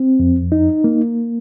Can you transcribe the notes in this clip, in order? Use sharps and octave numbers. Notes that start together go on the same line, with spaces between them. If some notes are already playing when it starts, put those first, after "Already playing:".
Already playing: C4
F2
D#4
A#3